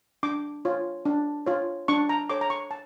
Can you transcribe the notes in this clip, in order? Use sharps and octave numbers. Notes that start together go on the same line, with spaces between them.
D4 D6
F4 C#5
D4
F4 C#5
D4 C#6
A#5
A4 C#5 D6
A#5
C#6
A5